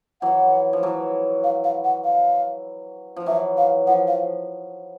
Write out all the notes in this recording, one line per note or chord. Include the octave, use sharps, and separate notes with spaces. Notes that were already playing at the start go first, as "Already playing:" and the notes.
E3 F#3 F#5
F3
E3 F#3
F5
F5
F#5
F5
F3
E3 F#3 E5
F5
F3 F#5
F5